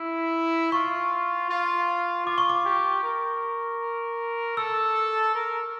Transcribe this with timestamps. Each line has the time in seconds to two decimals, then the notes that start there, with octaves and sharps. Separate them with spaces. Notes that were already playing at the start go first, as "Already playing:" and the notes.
Already playing: E4
0.72 F4 C#6
1.49 F4
2.26 F4 D6
2.38 C#6
2.50 D6
2.65 G4
3.03 A#4
4.57 A4 E6
5.34 A#4